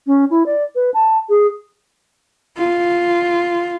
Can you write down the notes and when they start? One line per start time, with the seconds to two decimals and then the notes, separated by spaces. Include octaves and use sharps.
0.07 C#4
0.30 E4
0.46 D5
0.75 B4
0.94 A5
1.29 G#4
2.57 F4